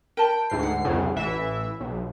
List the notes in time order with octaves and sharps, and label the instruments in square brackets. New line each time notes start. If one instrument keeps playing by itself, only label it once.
[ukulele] A#4 A5 B5 [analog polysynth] G5
[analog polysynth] D2 G#2 C7
[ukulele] F#5
[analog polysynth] C2 F2 C#3
A1 E3 E5
B1